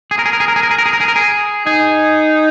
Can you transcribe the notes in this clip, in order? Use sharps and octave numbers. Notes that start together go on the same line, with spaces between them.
G#4
A#4
G#4
A#4
G#4
A#4
G#4
A#4
G#4
A#4
G#4
A#4
G#4
A#4
G#4
D#4 G#4